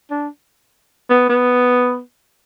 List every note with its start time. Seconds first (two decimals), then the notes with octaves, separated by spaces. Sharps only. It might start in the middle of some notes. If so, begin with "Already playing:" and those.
0.11 D4
1.10 B3
1.30 B3